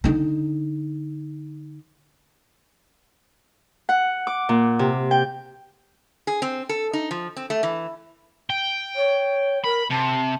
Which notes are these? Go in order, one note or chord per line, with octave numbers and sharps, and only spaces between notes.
D3 D#4
F#5
D6
A#2
C3
G5
G#4
C4
A4
D#4
F3
C4
A3
E3
G5
C#5
A#4 B5
C3 A5